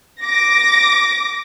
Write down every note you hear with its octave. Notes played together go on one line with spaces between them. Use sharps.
D6 A#6